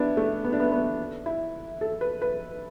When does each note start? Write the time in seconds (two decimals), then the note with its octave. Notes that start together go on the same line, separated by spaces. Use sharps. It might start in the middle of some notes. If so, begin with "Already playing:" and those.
Already playing: B3 D4 E4
0.17 A3
0.44 B3
0.53 D4
0.60 B3
0.72 B3
1.26 E4
1.81 A4
2.01 B4
2.22 B4